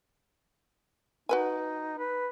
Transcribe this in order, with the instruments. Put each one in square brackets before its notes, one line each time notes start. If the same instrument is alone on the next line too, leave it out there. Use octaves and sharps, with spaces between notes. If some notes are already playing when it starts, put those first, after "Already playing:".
[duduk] D#4 [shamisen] F#4 B4 G#5
[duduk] B4